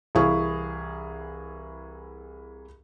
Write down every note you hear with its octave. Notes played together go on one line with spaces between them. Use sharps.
C2 E3 E4 G#4 F5 C#6